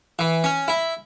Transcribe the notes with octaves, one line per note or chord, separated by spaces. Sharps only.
E3
C#4
E4